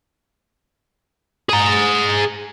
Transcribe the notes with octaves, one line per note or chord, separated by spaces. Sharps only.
G#4 A#5